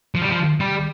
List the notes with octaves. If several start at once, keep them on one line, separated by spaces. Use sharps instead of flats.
F3
G3
F3
G3